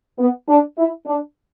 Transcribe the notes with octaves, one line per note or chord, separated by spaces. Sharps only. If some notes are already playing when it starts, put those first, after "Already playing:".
B3
D4
E4
D4